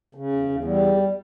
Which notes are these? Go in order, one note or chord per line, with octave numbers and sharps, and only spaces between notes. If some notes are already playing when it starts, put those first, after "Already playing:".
C#3
E2
E2
G3